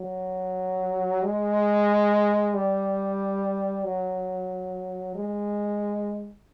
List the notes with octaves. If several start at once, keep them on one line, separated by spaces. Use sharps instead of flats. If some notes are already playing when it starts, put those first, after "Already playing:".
Already playing: F#3
G#3
G3
F#3
G#3